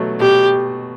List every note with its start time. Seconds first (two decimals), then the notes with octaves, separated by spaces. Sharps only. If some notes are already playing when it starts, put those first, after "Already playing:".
Already playing: B2 F#3 A3
0.20 B2 G4